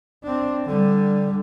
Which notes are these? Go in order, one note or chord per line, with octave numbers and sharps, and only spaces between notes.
C4 D4
D3 G3